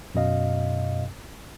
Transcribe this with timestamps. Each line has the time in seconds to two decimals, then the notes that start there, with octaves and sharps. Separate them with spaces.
0.15 F#2 B2 D#5 F5